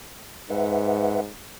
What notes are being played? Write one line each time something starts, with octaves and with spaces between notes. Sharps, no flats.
G#2 B4 E5 F#5